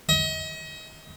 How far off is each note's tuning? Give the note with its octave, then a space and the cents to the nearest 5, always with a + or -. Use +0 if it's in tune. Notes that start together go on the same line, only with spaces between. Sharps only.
D#5 +35